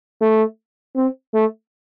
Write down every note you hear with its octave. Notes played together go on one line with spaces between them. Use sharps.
A3
C4
A3